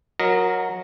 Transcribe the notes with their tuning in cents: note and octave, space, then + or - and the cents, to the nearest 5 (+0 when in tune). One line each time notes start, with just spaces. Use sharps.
F#3 -15 A#4 +0 D#5 +0